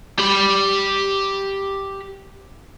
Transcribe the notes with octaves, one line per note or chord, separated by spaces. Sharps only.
G4 B5